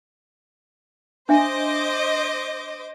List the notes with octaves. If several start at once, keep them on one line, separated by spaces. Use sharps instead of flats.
D4 C5 D#5 E5 G#5 D6